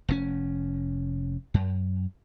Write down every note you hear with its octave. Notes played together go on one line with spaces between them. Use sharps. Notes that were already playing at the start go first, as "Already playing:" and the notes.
F1 G#2 C#4
F#2